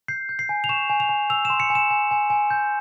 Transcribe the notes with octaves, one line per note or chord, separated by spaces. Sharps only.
G6 C7
G6
C7
G#5
F7
C#6 E7
G#5
F7
G#5
E6 F7
E7
C6
C#7
G#5
E7
G#5
G#5
G#5
G6